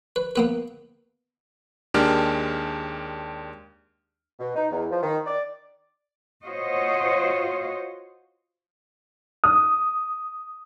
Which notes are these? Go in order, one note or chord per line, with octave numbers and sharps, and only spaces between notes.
B4
A#3 B3 B4
D#2 G#3 D4 G4 A#4 F6
B2
D#4
E2
F3
D#3
D5
F4 F#4 C5 C#5 D#5
D#6